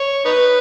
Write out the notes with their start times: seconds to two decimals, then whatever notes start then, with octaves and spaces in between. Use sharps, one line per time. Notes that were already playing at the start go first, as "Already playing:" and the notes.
Already playing: C#5
0.25 D#4 B4